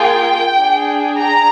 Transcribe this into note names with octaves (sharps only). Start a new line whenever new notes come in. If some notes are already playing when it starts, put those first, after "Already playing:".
Already playing: A#3 F4 G#4 G5
D4 G#4
A#5